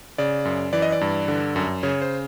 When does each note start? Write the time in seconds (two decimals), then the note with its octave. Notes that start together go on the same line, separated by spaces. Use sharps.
0.18 C#3 D5
0.45 F#2
0.73 E3 D5
0.82 D#5
0.92 D5
1.01 G2
1.28 D3
1.56 F#2
1.83 C#3 C#5
2.02 C5